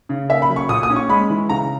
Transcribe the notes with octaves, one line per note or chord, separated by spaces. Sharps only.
C#3
A#3 E5
B5
F#3
C#6
A#2 D#6
D#6
C#4
C#6
G#3 B5
E3
C#3 A#5